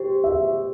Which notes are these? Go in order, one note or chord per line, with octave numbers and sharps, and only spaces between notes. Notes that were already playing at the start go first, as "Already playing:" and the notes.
Already playing: G4 C5
E5